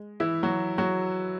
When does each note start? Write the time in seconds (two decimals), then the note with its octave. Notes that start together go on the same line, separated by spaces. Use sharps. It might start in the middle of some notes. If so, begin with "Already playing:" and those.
Already playing: G#3
0.20 E3 E4
0.43 F#3 F#4
0.78 F#3 F#4